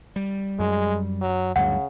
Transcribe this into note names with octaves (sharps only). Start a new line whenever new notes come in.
G3
F#2 G#3
F#3
D2 G2 C#3 F#3 F#5